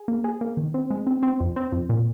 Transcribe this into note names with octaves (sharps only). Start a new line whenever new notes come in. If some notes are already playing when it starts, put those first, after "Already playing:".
Already playing: G#4
A#3
G#4
A#3
D#3
C4
G#3
C4
C4
F2
C4
F2
A#2